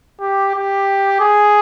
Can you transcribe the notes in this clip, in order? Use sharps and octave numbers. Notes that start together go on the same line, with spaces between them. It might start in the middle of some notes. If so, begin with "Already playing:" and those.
G4
G4
G#4